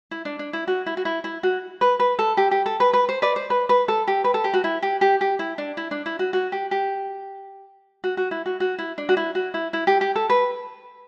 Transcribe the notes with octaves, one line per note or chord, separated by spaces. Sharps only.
E4
D4
D4
E4
F#4
E4
F#4
E4
E4
F#4
B4
B4
A4
G4
G4
A4
B4
B4
C5
B4 D5
C5
B4
B4
A4
G4
B4
A4
G4
F#4
E4
G4
G4
G4
E4
D4
E4
D4
E4
F#4
F#4
G4
G4
F#4
F#4
E4
F#4
F#4
E4
D4
F#4
E4
F#4
E4
E4
G4
G4
A4
B4